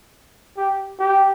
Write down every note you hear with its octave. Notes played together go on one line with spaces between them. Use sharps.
G4
G4